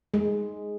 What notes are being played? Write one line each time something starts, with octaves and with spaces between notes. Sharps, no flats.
G#3